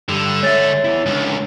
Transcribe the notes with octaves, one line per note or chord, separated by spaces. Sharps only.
G2 D3 G3
G#3 C#5 E5 A6
B3 E4
C#2 C#3 D4